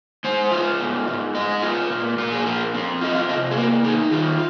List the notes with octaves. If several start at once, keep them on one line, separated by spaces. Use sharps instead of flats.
G#3 C5
F4
G#2
G#2
G#3 D#5
F4
A#2
A#2 F4
G#4
F3 A#4
C4
F4 D#5
F5
C3 D#5
G#4
A#3 A#4
D#4 G#4
D#3 F4